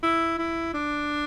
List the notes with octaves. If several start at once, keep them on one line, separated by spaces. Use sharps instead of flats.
E4
E4
D4